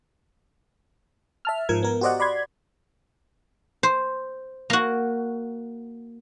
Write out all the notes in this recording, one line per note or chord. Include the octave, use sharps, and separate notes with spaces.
E5 A5 F6
G#2 F3 A#4 G#6
B3 A#4
F#4 G4 C5 D5 D#5 F#5
D5 B5 C6 G#6
C5
A#3 F#4